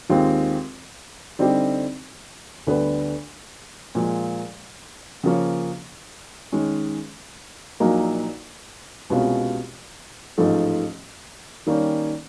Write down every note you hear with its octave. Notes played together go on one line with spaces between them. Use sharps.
D#2 D#3 G#3 C4 F4
D3 G3 C4 D#4 G4
D2 D3 G3 B3
A#2 F3 G#3
C#3 F3 A#3 C#4
D#3 G#3 C#4
A#1 A#2 F#3 A#3 D#4
C2 B2 G#3 C#4 F4
A1 G#2 F3 A3
D#3 G3 A#3 C#4